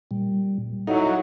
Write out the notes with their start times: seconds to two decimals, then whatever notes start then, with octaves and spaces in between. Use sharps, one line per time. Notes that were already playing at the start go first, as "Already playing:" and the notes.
0.11 A#2 G3
0.87 F#3 D#4 E4 A4 F5